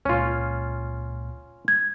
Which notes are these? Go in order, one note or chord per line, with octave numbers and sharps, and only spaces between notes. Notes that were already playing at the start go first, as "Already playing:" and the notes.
C#2 A#2 C#4 F4
G#6